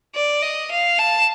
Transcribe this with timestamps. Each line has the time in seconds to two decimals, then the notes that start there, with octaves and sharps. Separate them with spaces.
0.15 D5
0.42 D#5
0.71 F5
0.99 A5